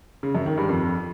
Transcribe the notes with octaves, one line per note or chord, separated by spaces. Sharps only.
C#3
F#2
D#3
G2
F2